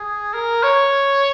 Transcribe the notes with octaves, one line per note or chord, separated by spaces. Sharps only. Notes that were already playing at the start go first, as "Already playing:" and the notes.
Already playing: G#4
A#4
C#5